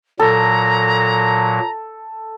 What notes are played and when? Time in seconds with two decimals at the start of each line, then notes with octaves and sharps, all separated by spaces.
0.20 A#2 F#3 A4 A#5